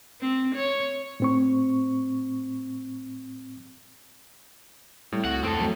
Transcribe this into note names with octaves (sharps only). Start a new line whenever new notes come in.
C4
C#5
A2 C4 C#6
A2 G3 C4
C#2 F#4 F#5
F2 A3 B3 C4 A4
F#3 A3 B3